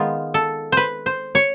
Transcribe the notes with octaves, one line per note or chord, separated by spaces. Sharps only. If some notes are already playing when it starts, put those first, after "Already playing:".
Already playing: D#3 G#3 B3 F4
A4
B4 C5
C5
C#5